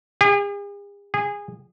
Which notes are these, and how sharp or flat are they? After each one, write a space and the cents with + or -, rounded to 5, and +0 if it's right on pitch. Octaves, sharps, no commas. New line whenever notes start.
G#4 -45
G#4 -20